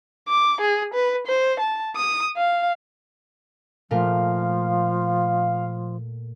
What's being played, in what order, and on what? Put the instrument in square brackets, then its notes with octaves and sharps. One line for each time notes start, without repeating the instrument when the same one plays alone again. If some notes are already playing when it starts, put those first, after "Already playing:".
[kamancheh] D6
G#4
B4
C5
A5
D#6
F5
[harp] A#2 A3 A#4 [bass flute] F3 [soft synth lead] F5